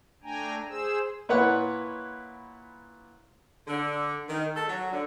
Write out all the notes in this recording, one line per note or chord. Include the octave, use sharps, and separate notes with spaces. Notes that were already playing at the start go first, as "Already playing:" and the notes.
A3 D4 G5 G#5 A#5
G#4 C5 E6
A#2 E4 B4 C#5 F#5 F#6
D3
D#3
A4
F#3
D3